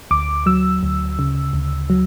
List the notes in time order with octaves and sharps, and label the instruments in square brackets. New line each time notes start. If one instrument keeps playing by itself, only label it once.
[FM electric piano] D2 D6
F#3 E6
D2
C#3
D2
F#3